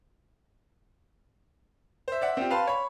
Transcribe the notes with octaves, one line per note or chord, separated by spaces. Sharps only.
C5 E5
D5 E5 F#5
C4 F4 G4
B4 F5 A5 B5 C6
C#5 B5